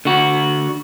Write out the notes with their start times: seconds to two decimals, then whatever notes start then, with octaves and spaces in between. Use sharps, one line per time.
0.05 D3 F#4